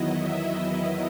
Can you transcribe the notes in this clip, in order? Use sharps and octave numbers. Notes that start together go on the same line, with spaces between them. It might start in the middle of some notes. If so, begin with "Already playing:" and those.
Already playing: E2 D#3 F#3 B3 E4 D#5
E5